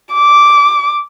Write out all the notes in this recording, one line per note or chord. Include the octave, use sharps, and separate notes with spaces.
D6